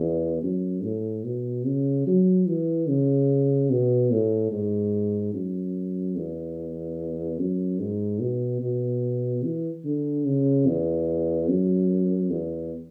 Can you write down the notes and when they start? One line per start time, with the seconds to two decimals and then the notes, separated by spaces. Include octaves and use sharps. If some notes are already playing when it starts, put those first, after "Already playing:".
Already playing: E2
0.43 F#2
0.83 A2
1.24 B2
1.66 C#3
2.07 F#3
2.47 E3
2.88 C#3
3.70 B2
4.11 A2
4.52 G#2
5.34 F#2
6.16 E2
7.39 F#2
7.80 G#2
8.21 B2
8.62 B2
9.43 E3
9.84 D3
10.26 C#3
10.66 E2
11.48 F#2
12.30 E2